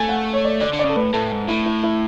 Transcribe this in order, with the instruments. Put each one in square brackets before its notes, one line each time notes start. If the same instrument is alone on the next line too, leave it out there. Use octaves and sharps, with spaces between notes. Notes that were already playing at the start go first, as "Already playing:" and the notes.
Already playing: [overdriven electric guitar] A3 [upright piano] G#5
[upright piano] F#5
C#5
D5
[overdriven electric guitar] D3 [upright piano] D5
[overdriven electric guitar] D3
[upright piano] D5
[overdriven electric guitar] C#3 [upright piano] A4
[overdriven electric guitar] A2 [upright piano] B4
[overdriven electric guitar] A2 [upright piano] A4
[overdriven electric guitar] G#2
[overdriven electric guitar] A2 [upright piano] E4
[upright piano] E4
E4